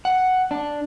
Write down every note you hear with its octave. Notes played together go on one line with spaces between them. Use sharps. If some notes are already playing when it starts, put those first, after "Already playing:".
F#5
D4